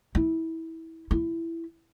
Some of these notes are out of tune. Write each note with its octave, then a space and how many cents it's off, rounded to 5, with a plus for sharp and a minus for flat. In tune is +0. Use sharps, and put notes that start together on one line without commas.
E4 -20
E4 +10